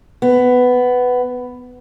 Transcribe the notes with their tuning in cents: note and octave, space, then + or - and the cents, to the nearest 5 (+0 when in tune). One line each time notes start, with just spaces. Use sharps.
B3 +10